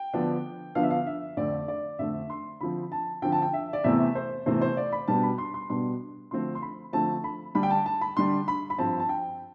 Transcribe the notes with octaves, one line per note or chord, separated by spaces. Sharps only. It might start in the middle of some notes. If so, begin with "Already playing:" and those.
Already playing: G5
D3 F3 B3 D4
D3 F3 B3 D4 F5
E5
F5
E5
F2 D3 A3 C4 D5
D5
F2 D3 A3 C4 E5
C6
D3 F3 C4 B5
A5
D3 F3 C4 G5
A5
G5
E5
D5
E2 C3 E3 A3 C4 E5
C5
E2 C3 E3 A3 C4 C5
C5
D5
B5
B2 G3 B3 D4 A5
B5
C6
C6
B2 G3 B3 D4 C6
D3 F3 A3 C4 C6
C6
B5
D3 F3 A3 C4 A5
B5
D3 G3 D4 B5
G5
A5
A5
B5
D3 G3 D4 C6
B5
B5
G2 F3 C4 A5
A5
G5